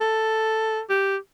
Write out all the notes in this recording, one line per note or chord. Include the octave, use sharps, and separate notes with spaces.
A4
G4